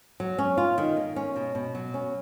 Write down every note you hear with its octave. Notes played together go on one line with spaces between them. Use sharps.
F#3
C#4
F4
D#3
A#3
C#4
B2
B2
F#3
C#4